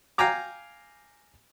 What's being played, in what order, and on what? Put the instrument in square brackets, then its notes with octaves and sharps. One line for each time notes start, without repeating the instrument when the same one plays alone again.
[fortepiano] F5 G5 G#5 A#5 D6